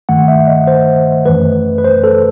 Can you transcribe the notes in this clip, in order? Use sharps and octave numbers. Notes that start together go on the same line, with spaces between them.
G2 D#3 A3 F#5
E5
D#5
C5
F#2 E3 A3 B4
B4
C5
A4